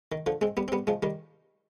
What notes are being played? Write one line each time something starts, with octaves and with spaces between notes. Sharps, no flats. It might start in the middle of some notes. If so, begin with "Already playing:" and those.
D#3
D3 F3
G#3 C4
G3 B3
C4
G3 B3
F3 G#3
D#3 G3